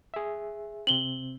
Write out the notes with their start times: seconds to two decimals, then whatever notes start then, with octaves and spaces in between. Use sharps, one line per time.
0.14 G#4 E5
0.87 C3 C4 F#7 G7